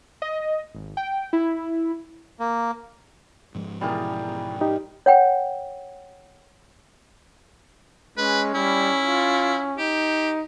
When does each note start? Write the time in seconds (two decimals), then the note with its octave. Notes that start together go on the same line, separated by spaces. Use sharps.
0.22 D#5
0.75 G#1
0.97 G5
1.33 E4
2.39 A#3
3.55 G#2 F3 G#3
3.81 B2 E3 G3 G#4 A#4
4.61 D#4 G4
5.06 C#5 F#5 G5
8.18 G#3 C#4 B4
8.55 G3 E4
9.02 F4
9.78 D#4 G4